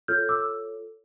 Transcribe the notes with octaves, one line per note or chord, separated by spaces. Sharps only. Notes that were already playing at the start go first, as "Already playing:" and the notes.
F4 A4 C#5 F6 G6
D6 E6